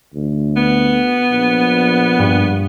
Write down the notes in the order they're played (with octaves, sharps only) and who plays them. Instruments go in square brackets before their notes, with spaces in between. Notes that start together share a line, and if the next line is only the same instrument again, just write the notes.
[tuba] D2
[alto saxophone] B3
[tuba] A#1
[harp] G2